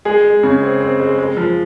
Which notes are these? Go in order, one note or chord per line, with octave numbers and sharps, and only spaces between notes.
G#3 G#4
G#3
C#3
C4
C4
G#3
G#3
F3